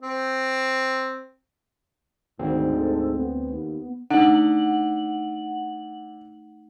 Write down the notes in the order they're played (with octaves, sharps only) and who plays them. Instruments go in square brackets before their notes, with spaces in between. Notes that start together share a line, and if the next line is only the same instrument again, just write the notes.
[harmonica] C4
[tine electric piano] D2 D3 C4 [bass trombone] G#2 [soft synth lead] D#3
[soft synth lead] A4
B3
[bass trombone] D#2
[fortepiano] D3 [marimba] A3 D#4 [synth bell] F#5 F#7